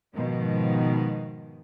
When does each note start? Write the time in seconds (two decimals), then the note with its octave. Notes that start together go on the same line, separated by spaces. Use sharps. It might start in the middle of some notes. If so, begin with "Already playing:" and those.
0.15 G#2 B2 D#3 F3